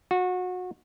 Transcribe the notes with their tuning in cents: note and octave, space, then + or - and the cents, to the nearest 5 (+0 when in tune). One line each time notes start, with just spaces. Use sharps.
F#4 -25